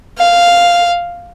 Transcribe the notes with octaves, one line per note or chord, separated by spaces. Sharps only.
F5